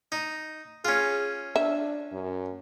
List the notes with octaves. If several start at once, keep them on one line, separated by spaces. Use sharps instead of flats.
D#4
C#4 F4 G#4
D4 E5
F#2